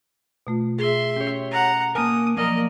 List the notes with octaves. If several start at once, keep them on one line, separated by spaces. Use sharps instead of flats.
B2 A3 F4
G#4 E5 C6
C#4 G4 C#5 G6
F#5 A#5
A#3 A#4 G#5 A5 D#6 F6
F3 F#3 A#3 A#4 D5 D#5